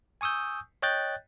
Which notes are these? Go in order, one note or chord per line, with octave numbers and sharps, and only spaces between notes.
G#5 C#6 D#6 E6 G6
C#5 D#5 G5 F#6 G6 A6